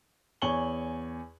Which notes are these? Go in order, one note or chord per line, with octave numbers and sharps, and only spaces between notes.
E2 C#5 G#5 C#6 F#7 G7